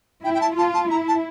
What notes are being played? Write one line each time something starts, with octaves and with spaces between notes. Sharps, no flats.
E4 G5
G5
A5
F4 A5
A5
E4 A#5
A5